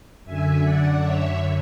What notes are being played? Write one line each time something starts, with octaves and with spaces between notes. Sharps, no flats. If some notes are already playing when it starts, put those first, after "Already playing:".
F#2 D3 E5 G#5
D5 F#5
C#5 E5